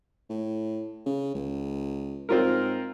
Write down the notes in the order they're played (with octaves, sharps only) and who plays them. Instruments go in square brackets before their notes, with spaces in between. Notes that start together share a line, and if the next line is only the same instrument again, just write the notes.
[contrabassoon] A2
C#3
C#2
[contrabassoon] G#2 [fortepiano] C4 F4 A#4